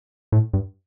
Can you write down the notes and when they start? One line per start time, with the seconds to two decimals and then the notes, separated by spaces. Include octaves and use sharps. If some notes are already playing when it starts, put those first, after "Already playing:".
0.32 A2
0.53 G2